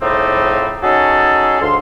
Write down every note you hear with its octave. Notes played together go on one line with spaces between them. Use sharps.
A2 C#3 F3 G3 C4 D#4
C#4 D#4 F#4 G#4 A4
D2 G#2 D3 F5 C6